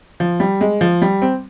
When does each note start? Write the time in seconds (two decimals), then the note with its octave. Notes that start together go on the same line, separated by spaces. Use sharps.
0.20 F3
0.40 G3
0.61 G#3
0.81 F3
1.02 G3
1.22 C4